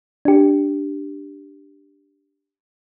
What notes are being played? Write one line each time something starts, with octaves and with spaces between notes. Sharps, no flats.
D4 G4